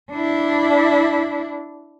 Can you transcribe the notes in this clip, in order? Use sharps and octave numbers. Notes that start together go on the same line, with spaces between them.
D4 E4